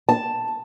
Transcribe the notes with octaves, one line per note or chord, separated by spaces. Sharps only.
A5